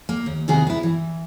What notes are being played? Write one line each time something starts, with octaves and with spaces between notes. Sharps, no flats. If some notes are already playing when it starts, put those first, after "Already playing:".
A#3
D#2
D#2 C3 D#3 F#4 G#4
B3 E4
E3